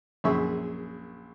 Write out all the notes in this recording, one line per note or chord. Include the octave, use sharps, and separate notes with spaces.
A#1 F#2 G#4 E5 C#6